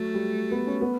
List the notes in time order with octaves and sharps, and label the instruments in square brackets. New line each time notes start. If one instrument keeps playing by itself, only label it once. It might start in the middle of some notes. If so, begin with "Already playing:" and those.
Already playing: [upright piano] F#3 [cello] A3
[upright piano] G3
B3
C#4
B3